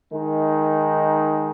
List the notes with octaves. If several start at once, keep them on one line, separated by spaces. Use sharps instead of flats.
D#3 G#3 D#4